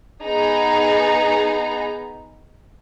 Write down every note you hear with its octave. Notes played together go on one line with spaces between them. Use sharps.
B3 D#4 G#4 A#5